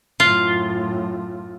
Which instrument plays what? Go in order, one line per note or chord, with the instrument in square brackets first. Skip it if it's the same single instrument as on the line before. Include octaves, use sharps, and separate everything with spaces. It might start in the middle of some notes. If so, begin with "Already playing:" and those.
[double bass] F#2 A2 [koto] F4